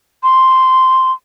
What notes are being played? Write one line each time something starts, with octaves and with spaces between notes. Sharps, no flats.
C6